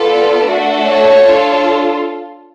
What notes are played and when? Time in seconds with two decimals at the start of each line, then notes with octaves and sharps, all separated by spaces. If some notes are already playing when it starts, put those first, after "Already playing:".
Already playing: B3 F4 A4 D5
0.47 A3 D4 F#4 A4
0.84 C#5
1.21 D4 F4 A4